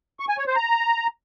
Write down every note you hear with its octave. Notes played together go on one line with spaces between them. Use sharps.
C#6
G#5
C#5
C5
A#5